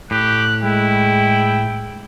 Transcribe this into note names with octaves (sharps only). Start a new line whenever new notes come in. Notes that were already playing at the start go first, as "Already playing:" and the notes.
A2 G4 F#6
G#3 E4 G5